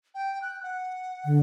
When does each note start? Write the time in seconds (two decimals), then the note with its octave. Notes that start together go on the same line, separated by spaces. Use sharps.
0.15 G5
0.42 F#6
0.63 F#5
1.25 D3